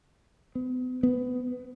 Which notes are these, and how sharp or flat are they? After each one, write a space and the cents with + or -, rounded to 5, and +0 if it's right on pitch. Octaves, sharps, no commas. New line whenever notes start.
B3 +40
B3 +25